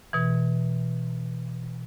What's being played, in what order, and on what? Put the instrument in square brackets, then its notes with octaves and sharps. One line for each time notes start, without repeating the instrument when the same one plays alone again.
[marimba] B2 E3